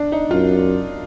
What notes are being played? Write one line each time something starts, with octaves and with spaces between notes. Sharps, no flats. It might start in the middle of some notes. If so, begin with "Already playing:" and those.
Already playing: D4
D#4
F#2 F4